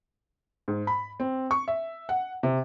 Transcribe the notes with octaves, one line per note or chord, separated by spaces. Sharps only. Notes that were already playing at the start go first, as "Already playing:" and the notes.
G#2
B5
C4
C#6
E5
F#5
C3